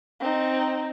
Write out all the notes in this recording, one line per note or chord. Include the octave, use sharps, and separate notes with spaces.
C4 D#4